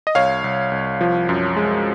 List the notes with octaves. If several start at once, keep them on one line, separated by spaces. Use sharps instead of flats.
D#5
C2 C#5 F5
C2
C2
F3
F#2
G#3